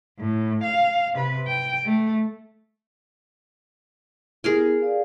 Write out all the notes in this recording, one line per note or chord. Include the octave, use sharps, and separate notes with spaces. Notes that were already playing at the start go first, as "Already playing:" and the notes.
A2
F5
C3 B4
G5
A3
B3 E4 G4 G#4 A#4 G#5
G4 D5 F5